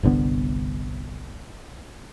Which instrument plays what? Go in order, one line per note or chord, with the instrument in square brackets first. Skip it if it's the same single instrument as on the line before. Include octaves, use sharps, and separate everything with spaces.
[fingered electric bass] G1 C2 D3 B3